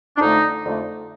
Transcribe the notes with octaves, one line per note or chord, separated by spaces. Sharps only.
D4
F2 D3 A3 D#4
F2 D3 A3